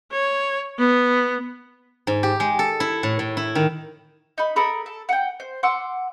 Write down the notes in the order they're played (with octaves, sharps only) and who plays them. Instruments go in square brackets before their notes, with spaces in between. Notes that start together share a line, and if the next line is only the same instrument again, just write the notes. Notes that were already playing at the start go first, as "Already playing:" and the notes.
[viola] C#5
B3
[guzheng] G#2
G4
G#3
A4
E4
A2
A2
E4
D#3
[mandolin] D#4 B5
A4 A#4 B5 D#6
A4
F#5 G5
C5
F#5 C6 D6 E6